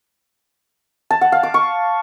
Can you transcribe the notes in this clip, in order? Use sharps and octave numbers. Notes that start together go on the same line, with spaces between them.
A5
F#5
F5
D6
C#6